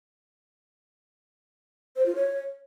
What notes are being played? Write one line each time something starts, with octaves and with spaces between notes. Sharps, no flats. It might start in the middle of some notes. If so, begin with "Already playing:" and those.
C5
F4
C#5